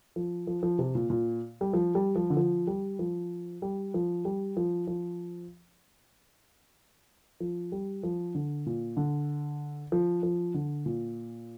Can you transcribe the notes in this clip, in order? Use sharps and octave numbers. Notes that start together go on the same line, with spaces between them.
F3
F3
F3
C3
A#2
A#2
G3
F3
G3
F3
D3
F3
G3
F3
G3
F3
G3
F3
F3
F3
G3
F3
D3
A#2
D3
F3
F3
D3
A#2